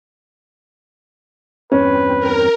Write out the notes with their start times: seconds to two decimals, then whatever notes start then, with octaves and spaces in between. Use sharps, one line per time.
1.72 E2 G2 C4 C#4 B4
2.20 A#4